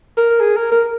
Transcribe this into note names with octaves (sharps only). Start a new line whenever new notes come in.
A#4
G#4
A#4
A#4